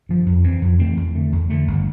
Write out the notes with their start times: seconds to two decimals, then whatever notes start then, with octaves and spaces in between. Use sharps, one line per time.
0.09 G2 F3
0.26 F2
0.44 E3 A3 C4
0.62 F2
0.79 E3 A3 C4
0.97 E2
1.15 D3 A3
1.33 E2
1.50 D3 A3
1.68 G1